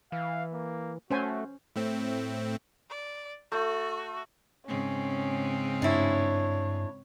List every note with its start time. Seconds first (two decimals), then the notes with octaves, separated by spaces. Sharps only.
0.12 E3 F5
0.53 A#3
1.10 A3 C#4 F#4 C5 G#5
1.76 A2 A3 C4
2.90 D5
3.52 A3 F#4
4.68 G#2 C#3 C4 C#4
5.82 G2 D4 E4 C#5